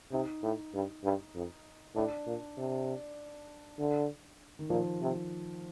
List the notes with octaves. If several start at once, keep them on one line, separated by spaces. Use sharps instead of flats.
C3 D#4
A2
G2
G2
F2
A2 D4
A#2
C3
D3
D#3
A#2 F3
C3